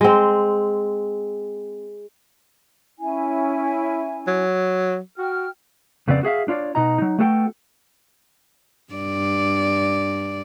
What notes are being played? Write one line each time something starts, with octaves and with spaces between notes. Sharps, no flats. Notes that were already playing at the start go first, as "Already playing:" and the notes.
G#3 C4
C#4 E4 G#5
F#3
F#4 G5 F6
F2 C#3 B3 C4 D5
F#4 G#4 E5 F5
D4 F4 C#5 D5
B2 D#4 D#5 A#5
F#3 D#4
A3 B3 F#4 A4 F#5 G5
G2 D5